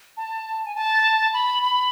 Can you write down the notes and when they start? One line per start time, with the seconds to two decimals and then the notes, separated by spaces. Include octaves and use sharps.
0.17 A5
0.66 G#5
0.75 A5
1.33 B5
1.63 B5